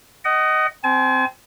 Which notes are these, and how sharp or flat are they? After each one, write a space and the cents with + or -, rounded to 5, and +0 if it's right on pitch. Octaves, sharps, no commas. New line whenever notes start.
D#5 +0 F#5 +35
C4 -10 G#5 +40